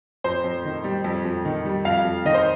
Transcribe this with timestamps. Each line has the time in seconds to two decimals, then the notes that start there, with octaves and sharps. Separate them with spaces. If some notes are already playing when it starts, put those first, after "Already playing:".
0.24 F2 C5
0.44 F2
0.65 D#3
0.84 G3
1.04 F2
1.25 F2
1.45 D#3
1.65 G3
1.85 F2 F5
2.05 F2
2.25 D#3 D#5
2.34 C5